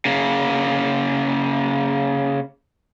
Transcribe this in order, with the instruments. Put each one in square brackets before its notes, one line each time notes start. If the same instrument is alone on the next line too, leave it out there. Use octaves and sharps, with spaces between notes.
[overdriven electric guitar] C#3 A#3